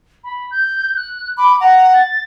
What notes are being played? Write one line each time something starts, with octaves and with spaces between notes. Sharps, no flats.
B5
G6
F#6
B5 D6
F#5 A#5
A6